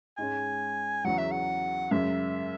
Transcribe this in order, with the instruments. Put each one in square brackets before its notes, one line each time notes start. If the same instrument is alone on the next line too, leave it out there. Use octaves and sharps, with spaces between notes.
[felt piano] G#2 G#3 C#4 [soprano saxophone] G#5
[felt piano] E2 C#3 F#3 [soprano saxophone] F#5
[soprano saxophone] E5
F#5
[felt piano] F#2 C#3 G#3 [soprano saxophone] E5